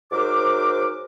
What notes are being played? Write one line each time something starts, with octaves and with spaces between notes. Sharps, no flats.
G#2 F#3 A#4 C5 D6